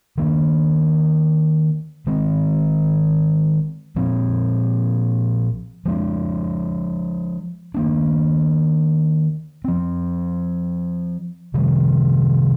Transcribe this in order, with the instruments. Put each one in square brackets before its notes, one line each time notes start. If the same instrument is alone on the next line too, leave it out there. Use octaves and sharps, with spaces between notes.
[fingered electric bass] D#3 A#3 D4
D#3 G#3 C4
A#2 F3 C4
F3 G#3 D4
D#3 A#3 D4
F3 C4
C3 D#3 G3